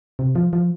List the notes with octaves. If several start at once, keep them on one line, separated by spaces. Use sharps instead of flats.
C3
F3
F3